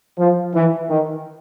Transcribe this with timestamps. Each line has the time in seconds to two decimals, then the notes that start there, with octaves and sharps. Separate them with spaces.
0.19 F3
0.54 E3
0.89 D#3